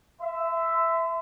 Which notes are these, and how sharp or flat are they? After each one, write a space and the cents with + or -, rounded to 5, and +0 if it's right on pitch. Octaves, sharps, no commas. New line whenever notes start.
E5 +0 C6 -40